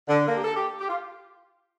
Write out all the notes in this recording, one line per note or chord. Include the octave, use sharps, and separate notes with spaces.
D3
A#3
G4
A4
G4
G4
F4